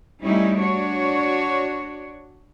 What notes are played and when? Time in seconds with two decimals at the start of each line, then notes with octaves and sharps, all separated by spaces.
0.23 G3 A3 C#4 D#4 E4
0.58 D4 F#4 C#5